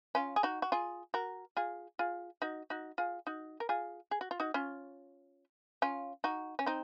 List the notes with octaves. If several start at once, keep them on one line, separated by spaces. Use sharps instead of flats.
C#4 F4
G#4
D#4 F#4
F#4
F4 G#4
F#4 A#4
F4 G#4
F4 G#4
D#4 F#4
D#4 F#4
F4 G#4
D#4 F#4
A#4
F4 G#4
G#4
F#4
F4
D#4 F#4
C#4 F4
C#4 F4
D#4 F#4
C#4
C4 D#4